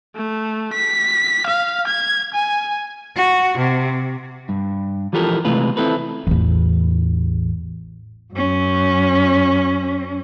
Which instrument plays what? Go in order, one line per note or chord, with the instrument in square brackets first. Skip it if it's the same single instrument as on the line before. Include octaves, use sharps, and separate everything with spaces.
[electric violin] A3
B6
F5
G#6
G#5
[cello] F#4
C3
[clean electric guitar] G2
E3 F3 F4 G4 A4 A#4
C3 E3 G#3 A3 F4 B4
C4 E4 A4 B4
[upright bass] A1 E2
[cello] F#2 C#4